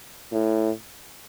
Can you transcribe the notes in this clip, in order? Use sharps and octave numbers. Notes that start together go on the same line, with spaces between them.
A2